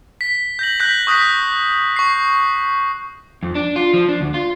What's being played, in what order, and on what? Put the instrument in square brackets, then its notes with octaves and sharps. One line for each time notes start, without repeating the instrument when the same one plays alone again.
[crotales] B6
G6 A#6 F#7
F#6 G6 A#6 B6 F#7
C#6 D#6 F#6 A#6 B6
C#6 C7
[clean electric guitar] F2
D4
F4
F3
D4
D2
F4